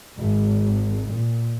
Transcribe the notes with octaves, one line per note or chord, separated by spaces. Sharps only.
G#1
A#2